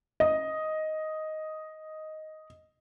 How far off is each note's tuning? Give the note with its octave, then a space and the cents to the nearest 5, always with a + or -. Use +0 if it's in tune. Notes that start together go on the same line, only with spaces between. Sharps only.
D#5 +5